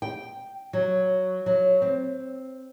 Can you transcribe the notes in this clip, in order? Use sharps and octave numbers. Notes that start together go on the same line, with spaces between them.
G5
F#3
F#3
C4